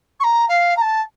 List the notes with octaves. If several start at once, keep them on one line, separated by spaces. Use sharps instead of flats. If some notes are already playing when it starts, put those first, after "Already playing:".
C#6
A#5
F5
A#5
A5